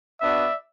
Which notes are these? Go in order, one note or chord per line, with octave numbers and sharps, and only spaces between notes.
B3 D4 F#4 D5 E5